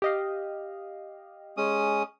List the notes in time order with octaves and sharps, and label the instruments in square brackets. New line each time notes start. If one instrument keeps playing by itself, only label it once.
[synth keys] G4 D#5 F5
[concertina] G#3 C#4 D#6